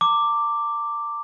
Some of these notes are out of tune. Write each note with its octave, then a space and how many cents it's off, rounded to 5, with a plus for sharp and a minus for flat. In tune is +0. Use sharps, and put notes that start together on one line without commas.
A#5 -40 D6 +0